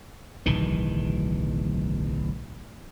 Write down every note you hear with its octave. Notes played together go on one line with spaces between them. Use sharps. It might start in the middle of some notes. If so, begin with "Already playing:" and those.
D1 B1 D#3 E3